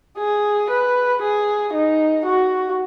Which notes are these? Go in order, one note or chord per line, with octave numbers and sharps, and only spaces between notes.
G#4
B4
G#4
D#4
F#4